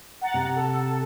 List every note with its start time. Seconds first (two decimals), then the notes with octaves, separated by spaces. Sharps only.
0.21 F#5 A#5 A6
0.34 C3
0.56 A4